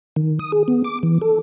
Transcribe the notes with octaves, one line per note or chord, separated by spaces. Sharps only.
D#3
D#6
G#4
B3
D6
E3
A4